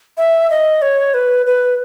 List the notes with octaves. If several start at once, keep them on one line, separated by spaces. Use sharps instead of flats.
E5
D#5
C#5
B4
B4